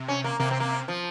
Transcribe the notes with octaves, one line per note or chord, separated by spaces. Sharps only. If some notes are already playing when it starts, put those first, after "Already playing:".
Already playing: C3
C#4
A#3
C3 A#3
C4
A#3
F3